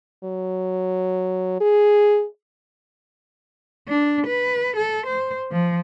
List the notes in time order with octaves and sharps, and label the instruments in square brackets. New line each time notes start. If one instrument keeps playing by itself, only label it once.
[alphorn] F#3
G#4
[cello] D4
B4
A4
C5
F3